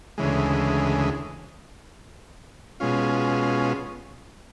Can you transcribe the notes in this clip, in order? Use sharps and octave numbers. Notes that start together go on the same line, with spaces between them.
D2 C#3 E3 G#3
B2 G#3 C#4 F4